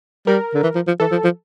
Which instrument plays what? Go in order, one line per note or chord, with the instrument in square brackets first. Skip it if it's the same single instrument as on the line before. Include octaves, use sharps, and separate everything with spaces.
[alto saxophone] G3 [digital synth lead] A#4
[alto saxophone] D3
E3
F3
F3
[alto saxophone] E3 [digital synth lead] A4
[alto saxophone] F3
F3